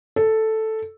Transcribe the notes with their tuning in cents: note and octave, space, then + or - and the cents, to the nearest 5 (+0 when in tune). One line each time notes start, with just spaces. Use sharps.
A4 +0